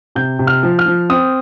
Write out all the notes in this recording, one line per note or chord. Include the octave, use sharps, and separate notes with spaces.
C3 G6
C3
F6
F3
F6
F3
C4 D#6